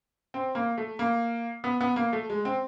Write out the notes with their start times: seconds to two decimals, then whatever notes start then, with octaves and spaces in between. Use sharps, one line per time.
0.34 C4
0.55 A#3
0.78 A3
0.99 A#3
1.64 B3
1.81 B3
1.96 A#3
2.13 A3
2.30 G#3
2.45 C4